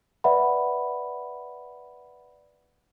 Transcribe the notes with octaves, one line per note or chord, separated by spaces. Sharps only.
B4 D5 E5 F#5 B5